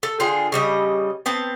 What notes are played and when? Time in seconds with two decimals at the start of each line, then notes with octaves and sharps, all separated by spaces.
0.03 A4
0.20 D3 F4 G#4 G5
0.52 C#3 G3 D#5
1.26 B3 C4 A5